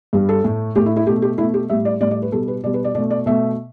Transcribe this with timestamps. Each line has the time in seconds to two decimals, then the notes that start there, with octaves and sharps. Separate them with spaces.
0.13 G2 G3
0.29 A4
0.44 A2 A3
0.76 A2 A3 G4
0.86 E4
0.97 E4
1.07 B2 A3 G4
1.22 G4
1.38 B2 A3 E4
1.54 G4
1.70 A2 G3 E5
1.85 D5
2.01 A2 G3 D5
2.11 D5
2.22 B4
2.32 B2 G3 A4
2.48 B4
2.64 B2 D5
2.66 G3
2.74 B4
2.84 D5
2.95 B2 D5
2.98 A3
3.10 D5
3.26 B2 A3 E5